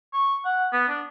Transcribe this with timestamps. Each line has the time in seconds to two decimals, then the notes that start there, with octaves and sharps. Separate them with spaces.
0.14 C#6
0.45 F#5
0.73 B3
0.89 D4